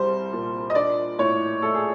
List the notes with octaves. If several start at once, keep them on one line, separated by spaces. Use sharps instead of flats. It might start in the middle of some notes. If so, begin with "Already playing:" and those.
Already playing: C2 G3 C5
A#2
D#5
D4 D5
A2 C#5
A3 A4
G#4